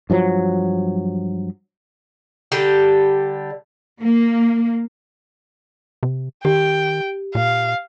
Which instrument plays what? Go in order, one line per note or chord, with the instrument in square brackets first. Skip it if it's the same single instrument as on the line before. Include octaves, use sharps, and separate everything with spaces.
[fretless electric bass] G2 F3 F#3
[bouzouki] D3 G3 G4 A5
[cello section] A#3
[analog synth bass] C3
[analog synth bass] D#3 [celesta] G4 [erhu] G5
[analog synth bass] A#2 [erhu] F5